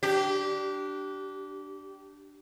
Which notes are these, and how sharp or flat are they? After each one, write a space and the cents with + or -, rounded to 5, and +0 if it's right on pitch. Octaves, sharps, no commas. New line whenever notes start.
D4 +0 G4 -25